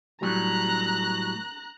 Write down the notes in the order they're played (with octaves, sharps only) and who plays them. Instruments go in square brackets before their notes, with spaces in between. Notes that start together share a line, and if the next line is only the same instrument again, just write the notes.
[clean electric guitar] A2 F#3 G3 [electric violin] A#5 F#6